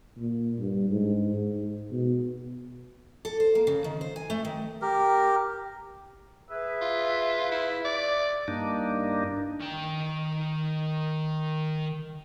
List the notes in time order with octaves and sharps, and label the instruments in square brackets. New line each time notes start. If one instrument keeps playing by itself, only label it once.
[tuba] A#2
G2
G#2
G#2
B2
[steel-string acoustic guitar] A4
C5
A#3
C#3
D#3
C5
G#5
A3
D#3
[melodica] G4 A#4
[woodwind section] G#4 B4 E5
[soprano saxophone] F4
E4
D5
[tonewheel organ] G2 A#3 D4 D#4
[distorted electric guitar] D#3 G5